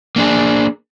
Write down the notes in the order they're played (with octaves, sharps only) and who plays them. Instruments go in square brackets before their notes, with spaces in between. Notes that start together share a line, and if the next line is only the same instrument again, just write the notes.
[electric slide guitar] A#3 D4 G#4